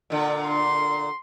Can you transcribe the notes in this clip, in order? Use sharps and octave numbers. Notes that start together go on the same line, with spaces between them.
A#2 D3
C6